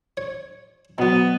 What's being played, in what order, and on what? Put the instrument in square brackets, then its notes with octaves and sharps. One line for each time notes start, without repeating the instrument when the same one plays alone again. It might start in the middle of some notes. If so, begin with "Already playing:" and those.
[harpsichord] C#5
[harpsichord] B2 F#3 [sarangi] B3